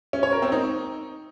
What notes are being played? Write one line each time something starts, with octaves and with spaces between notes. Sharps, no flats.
C#4
C#5
A#4
C4
D#4